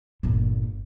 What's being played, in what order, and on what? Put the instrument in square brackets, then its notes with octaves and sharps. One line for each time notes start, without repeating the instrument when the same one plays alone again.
[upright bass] G1 A#2